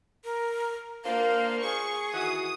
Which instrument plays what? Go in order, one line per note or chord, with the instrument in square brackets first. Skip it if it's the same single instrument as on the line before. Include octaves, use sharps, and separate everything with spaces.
[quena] A#4
[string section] A#3 [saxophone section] D4 F4 C5 [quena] F5
[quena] G#4 [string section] C#6
[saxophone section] D#3 E3 F#4 [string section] D#6